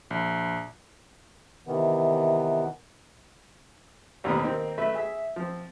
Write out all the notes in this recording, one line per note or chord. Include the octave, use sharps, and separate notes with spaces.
A#1
C3 D#3 E3 B3
A1 D#2 B2 C4 B4 D#6
D#3 A#3 C4
A3 B4 E5
G#4 E5
F3 C4